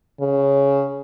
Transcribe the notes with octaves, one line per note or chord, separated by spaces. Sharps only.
C#3